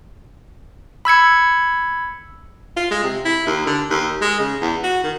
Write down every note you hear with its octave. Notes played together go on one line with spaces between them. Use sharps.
B5 E6 G#6 C#7
F4
G#3
C3
E4
D#2
D3
D#2
G#3
C#3
E2
F#4
D#3